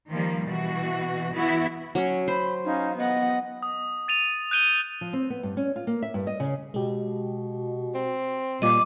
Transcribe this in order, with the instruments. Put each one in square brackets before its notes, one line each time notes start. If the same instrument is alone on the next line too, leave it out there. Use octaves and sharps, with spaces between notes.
[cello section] D#3 F3 G3 A#3
B2 E3 F#4
E3 B3 E4 F#4
[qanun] F#3 C#4
[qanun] C5 [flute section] B5
[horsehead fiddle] C#4 [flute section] D#4 F5
[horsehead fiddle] B3 F#5 [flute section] D#5
[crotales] D#6
A6 D#7 F7
F#6 G6 D#7 G7
[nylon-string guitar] F3
C4
B3
G2
C#4
F4
A#3
E5
G2
D#5
C#3
[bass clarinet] B2 [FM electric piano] G#3 G4
[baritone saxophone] C4
[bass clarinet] A#2 [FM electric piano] G3 A#3 F4 [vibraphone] D#5 D6